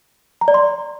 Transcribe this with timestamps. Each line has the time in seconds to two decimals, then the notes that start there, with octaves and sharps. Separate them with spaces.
0.41 A#5
0.48 D5
0.54 C6